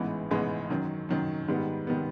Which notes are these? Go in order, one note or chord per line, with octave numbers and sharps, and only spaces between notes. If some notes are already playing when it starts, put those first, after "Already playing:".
Already playing: A1 G#2 E3 G#3 B3
A1 G#2 E3 G#3 B3
F#2 D#3 F#3
F#2 D#3 F#3
G#2 D#3 G3 B3
D#3 G3 B3